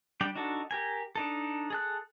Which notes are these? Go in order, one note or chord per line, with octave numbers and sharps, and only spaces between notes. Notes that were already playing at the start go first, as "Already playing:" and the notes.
G3 D4 D5 G5
D4 D#4 F#4 A4
G4 A#4 G#5
D4 D#4 A4
G#4 A4 F#6